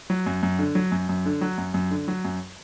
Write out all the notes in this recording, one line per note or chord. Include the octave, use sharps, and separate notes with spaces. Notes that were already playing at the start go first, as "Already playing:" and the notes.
F#3
F#2
F#2
D3
F#3
F#2
F#2
D3
F#3
F#2
F#2
D3
F#3
F#2